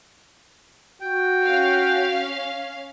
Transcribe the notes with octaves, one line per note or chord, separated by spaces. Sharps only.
F#4 G5
C#4 F5